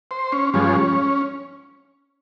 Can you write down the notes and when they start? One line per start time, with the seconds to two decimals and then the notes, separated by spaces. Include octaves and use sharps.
0.11 C5
0.32 C#4
0.54 G2 F3 G#3 C#4